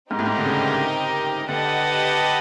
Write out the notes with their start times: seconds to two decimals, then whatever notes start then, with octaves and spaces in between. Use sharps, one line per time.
0.11 G#2 C4 D#4 G4 A#4 D#5
0.19 A2
0.26 G#2
0.38 D3
0.46 C#3
1.48 D3 G4 B4 D#5 F#5 A5